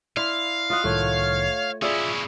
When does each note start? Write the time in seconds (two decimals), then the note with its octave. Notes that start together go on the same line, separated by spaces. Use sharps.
0.17 E4 D5 F5 B5 C6
0.70 F4 D#5 F#5 D#6
0.84 C2 A2 D#3 A3 C#5
1.82 C#4 E4 F4 G#4 D5 E5 E6